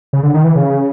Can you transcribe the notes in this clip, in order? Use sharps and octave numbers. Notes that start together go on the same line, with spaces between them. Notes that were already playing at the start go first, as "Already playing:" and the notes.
C#3
D3
D#3
E3
C#3